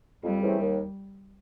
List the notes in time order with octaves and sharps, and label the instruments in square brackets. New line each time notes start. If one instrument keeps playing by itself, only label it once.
[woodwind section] F2 [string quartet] G3
[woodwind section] C#3 E3 A3 C4
D#2